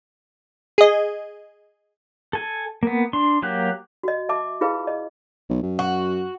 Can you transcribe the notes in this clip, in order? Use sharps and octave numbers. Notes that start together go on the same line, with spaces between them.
G#4 D#5
A4 G#5
A#3 B3
D4 C6
F#3 A#3 G4 F#6
F#4 D#5
E5 A5 D6
E4 F4 G#4 B4 F5
D#5
B1
F#2
F#4